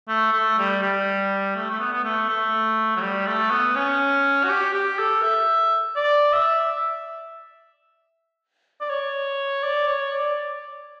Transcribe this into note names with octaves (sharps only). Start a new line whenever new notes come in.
A3
A3
G3
G3
A3
A3
B3
B3
A3
A3
F#3
G3
A3
B3
C#4
F#4
G4
G4
A4
E5
D5
E5
D5
C#5
D5
C#5
D5